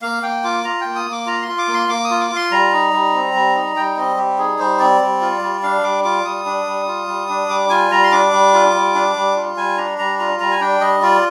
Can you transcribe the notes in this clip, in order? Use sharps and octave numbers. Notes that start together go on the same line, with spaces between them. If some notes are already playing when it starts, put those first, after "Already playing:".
A#3 F5
A#3 G5
F4 D6
F4 A#5
A#3 G5
D#6
A#3
D6
F4 A#5
C6
F4
D6
A#3
C6
A#3 D6
D#6
F4
D6
F4
C6
G3 A#5
D#4
G3
C4
G3
D#4
G3 G5
C4 D#5
G3 G4
D#4 G#4
G3 C5
C4 D5
G3
F4
G3
D4 F5
G3 D6
F4 D6
G3 D#6
D4
G3
F4
G3
D4
G3 D6
F4 G#5
G3 A#5
C6
D4 D6
G3
F4
G3
D4
G3
F4
G3 G#5
D4 A#5
G3 A#5
F4 A#5
G3 A#5
G#5
D4 G5
G3 D#5
F4 D5